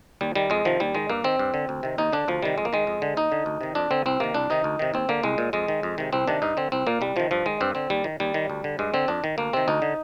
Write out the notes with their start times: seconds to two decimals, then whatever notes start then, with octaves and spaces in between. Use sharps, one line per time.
0.21 D#2 G3
0.36 D#3 G3
0.50 F2 G#3
0.65 C3 D#3 F3
0.80 D#2 G3
0.95 D#3 G#3
1.10 G2 A#3
1.24 D#3 C4
1.39 G2
1.54 D3
1.69 D2
1.83 C3 D#3
1.98 D#2 D#4
2.12 D3 D4
2.28 D2 F3
2.42 C3 D#3 G3
2.58 F2 G#3
2.65 A#3
2.73 D#3 G#3
2.87 F2
3.02 D3
3.17 D#2 D#4
3.32 D3
3.46 D2
3.61 C3 D#3
3.75 F2 D4
3.91 D3 C4
4.06 C2 C4
4.20 C3 D#3 A#3
4.34 C2 D4
4.50 C3 D#3 D#4
4.64 D2
4.79 C3 D#3
4.94 D#2 C4
5.09 D3 A#3
5.23 C2 G#3
5.38 A#2
5.53 F2 G#3
5.68 D#3
5.83 F2
5.98 C3 D#3
6.13 C2 C4
6.28 C3 D#3 D4
6.42 G2 D#4
6.57 D3 C4
6.72 C2 C4
6.87 A#2 A#3
7.01 C2 G3
7.16 C3 D#3 F3
7.31 G2 F3
7.46 D#3 G#3
7.61 G2 C4
7.75 D3 C4
7.90 D#2 G3
8.04 D#3
8.20 D#2 G3
8.34 D#3
8.50 D2
8.64 D3
8.79 G2 G#3
8.94 D3 C4
9.08 F2 D4
9.24 D#3
9.38 D2 A#3
9.53 C3 D#3 C4
9.68 D2 D#4
9.82 D3